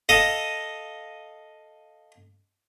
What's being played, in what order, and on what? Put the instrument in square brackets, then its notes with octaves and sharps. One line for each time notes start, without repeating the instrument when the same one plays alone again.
[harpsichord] A4 D#5 F5 D#6